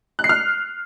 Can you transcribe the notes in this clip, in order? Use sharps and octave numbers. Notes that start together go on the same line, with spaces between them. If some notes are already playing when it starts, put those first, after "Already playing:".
F#6
C7
F6